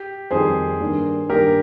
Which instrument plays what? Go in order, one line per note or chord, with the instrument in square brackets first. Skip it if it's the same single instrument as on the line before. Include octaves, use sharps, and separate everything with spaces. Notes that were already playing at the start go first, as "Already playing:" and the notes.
Already playing: [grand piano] G4
[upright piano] F2 D#3 G3 C4 [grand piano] G#4 C5
[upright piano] G2 D#3 A#3 D4
[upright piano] G2 D#3 A#3 D4 [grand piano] G4 A#4